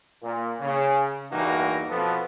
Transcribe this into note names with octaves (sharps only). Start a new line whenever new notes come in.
A#2
C#3
E2 G2 E3 A#3 D#4 F#4
F2 B2 F3 B3 A4 B4